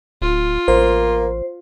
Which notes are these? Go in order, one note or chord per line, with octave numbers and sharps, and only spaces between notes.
D1 F4
A1 A#3 C5